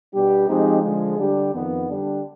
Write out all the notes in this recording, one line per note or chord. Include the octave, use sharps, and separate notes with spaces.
B2 G3 D4 G4
F3 G#3 C4 D#4 G4
D3 F3 G#3
D3 G3 D4 G4
F2 D#3 B3
D3 G3 D4 G4